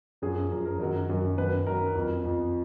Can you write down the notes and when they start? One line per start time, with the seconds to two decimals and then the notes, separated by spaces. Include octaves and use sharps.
0.22 F#2 F3 G#4
0.52 F#2 F3 A#4
0.65 A#4
0.79 F#2 D#3 F#3 A#4
1.09 F#2 D#3 F#3
1.38 F#2 D#3 F#3 B4
1.66 F#2 D#3 F#3 A#4
1.95 F2 F3
2.24 F2 F3